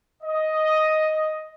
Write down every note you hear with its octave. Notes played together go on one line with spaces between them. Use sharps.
D#5